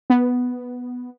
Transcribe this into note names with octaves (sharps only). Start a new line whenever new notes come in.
B3